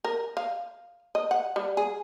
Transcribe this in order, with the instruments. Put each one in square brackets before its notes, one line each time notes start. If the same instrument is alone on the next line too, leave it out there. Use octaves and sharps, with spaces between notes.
[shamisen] A#4
F5
D#5
F#5
G3
G#4